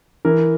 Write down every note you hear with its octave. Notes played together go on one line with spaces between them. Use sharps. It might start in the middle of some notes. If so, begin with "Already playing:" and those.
E3 A#4